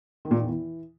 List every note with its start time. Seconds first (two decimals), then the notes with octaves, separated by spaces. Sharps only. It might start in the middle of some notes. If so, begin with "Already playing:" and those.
0.25 D#3
0.31 A#2
0.37 D#3
0.43 E2
0.49 E3